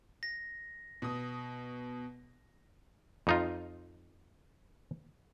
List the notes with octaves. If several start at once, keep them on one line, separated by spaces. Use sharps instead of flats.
A#6
B2 D#6
F2 D#4 F4